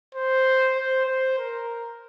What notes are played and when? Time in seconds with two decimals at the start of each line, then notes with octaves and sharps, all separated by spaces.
0.15 C5
0.76 C5
1.06 C5
1.38 A#4